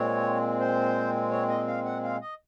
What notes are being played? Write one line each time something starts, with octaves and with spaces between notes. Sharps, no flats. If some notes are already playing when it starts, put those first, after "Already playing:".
Already playing: A#2 G#3 C4 C#5
C5
C#5
D#5
F5
F#5
F5
D#5